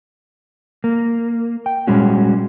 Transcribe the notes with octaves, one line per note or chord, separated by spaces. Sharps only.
A#3
G5
A#2 G3 G#3 C#4 F#4